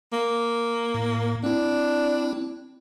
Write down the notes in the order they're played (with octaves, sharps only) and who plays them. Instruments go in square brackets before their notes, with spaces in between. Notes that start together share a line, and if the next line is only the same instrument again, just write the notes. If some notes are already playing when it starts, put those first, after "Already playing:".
[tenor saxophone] A#3
[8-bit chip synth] A2
[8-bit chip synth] C4 E4 [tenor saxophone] D4